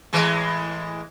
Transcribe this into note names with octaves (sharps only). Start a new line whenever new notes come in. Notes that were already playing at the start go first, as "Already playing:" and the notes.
A2 E3 G#3